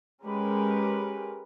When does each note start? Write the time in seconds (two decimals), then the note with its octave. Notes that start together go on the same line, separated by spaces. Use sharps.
0.24 G#3 C#4 G4 A#4 B4